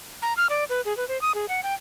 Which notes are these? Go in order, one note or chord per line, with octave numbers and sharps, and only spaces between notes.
A#5
F6
D5
B4
G#4
B4
C5
D#6
G#4
F#5
G5